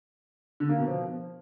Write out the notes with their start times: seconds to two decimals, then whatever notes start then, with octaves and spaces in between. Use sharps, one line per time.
0.60 D3
0.69 A#3
0.78 B2
0.88 F3